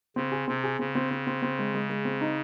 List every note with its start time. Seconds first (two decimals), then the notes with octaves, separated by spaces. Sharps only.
0.16 C#3 C4
0.32 G#4
0.48 C3 C4
0.64 G#4
0.79 C#3 C4
0.95 C4
1.11 C4
1.27 C4
1.42 C4
1.59 G#3
1.74 G#3
1.90 G#3
2.05 C4
2.21 D#4